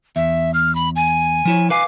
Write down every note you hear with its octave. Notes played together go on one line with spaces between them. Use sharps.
E2 E5
F6
B5
G#5
F3 E4 C#5
B4 F5 G#5 D6